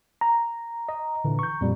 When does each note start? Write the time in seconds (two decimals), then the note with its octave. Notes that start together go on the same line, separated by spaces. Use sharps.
0.21 A#5
0.89 D#5
1.24 A#2 D3 E3
1.39 C#6 G6
1.61 F2 A#2 G3